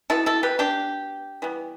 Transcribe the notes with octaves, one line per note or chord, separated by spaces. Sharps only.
B2 B3 E4 A4
E4 A4
G4 B4
D4 G4
E3 G3 B3